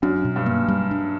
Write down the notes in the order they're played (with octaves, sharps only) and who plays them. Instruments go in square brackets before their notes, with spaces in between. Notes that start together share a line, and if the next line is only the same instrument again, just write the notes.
[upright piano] F#2 [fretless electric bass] D4
[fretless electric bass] B2
[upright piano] G2
[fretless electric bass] A#3
G3
D4